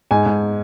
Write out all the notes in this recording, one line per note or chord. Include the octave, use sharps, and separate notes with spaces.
G#2 G#5
G#2